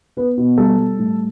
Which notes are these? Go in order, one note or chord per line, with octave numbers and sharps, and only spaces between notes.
B3 B4
B2
G3 A4
G3
A2